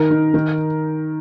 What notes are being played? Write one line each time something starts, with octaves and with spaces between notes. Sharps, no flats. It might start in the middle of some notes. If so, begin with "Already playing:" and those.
Already playing: D#3 A#4 A#5
D#4
D#3